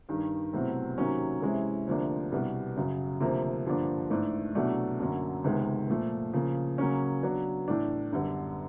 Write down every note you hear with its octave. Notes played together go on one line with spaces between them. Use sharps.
G2 D#3 G3
C2 B2 F#3 A3 C4
C3 D#3 F#3 A#3 C#4
C3 E3 G#3 C#4 E4
D2 C3 F3 A#3 D4
C2 B2 G3 B3
F#2 C#3 F#3
D2 C3 F3 A#3
G2 D3 F3 A#3 D4
G#2 E3 A3 D4
C2 B2 F#3 A3 D4
F#2 D3 F#3 A#3 C#4
C#2 C3 D#3 G#3 B3
A#2 F3 A3
C#3 F3 A#3
C#3 F#3 A#3 C#4
C#3 F#3 B3 D4
A2 E3 A3 D4
F#2 D3 G3 B3